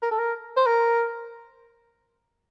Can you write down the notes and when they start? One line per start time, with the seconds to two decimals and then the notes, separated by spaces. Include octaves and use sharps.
0.03 A#4
0.11 A4
0.18 A#4
0.57 C5
0.66 A#4